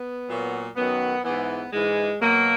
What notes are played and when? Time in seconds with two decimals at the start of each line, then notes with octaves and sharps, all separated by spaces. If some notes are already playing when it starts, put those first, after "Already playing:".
Already playing: B3
0.28 A#2 F#3
0.76 F#2 D#3 F#3 B3
1.24 G#2 E3 B3
1.72 G#2 E3 G#3
2.20 B2 F#3 A#3